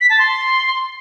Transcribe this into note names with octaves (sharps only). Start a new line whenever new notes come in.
B6
A5
C6